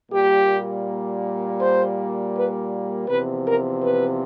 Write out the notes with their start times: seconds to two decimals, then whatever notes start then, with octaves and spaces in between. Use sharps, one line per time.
0.10 A#2 G3 A#3 G4
1.59 C5
2.33 B4
3.07 E2 C3 F3 B4
3.44 A#4
3.81 B4